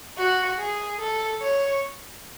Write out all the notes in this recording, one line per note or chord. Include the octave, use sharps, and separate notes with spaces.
F#4
G#4
A4
C#5